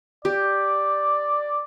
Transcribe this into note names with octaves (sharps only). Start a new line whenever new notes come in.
G4 D5